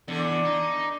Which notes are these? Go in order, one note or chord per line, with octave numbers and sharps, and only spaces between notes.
E2 D3
D#4